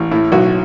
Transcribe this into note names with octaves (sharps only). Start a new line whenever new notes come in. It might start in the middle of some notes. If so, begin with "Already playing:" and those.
Already playing: A1
A2 E4
B1 F#4